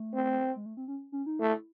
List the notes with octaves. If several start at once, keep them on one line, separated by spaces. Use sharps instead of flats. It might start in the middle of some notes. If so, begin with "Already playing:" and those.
Already playing: A3
C4
G#3
A3
C4
C#4
C#4
D#4
A3 E4